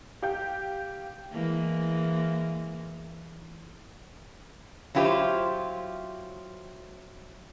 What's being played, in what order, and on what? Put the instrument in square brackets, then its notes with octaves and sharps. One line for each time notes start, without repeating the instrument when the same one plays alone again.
[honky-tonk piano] G4 F5 G5 G6
[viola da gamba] E3 G#3 A#3
[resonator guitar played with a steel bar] F#3 E4 F4 G4 C5